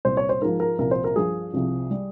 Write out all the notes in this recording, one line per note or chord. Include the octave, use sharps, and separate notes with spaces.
C2 A#2 G3 C5
C#5
C5
G#2 F3 A#4
A#4
C2 A#2 F3 A#4
C5
A#4
G2 F3 G#4
C2 C3 F3
G3